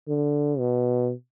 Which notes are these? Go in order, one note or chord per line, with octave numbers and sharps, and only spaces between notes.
D3
B2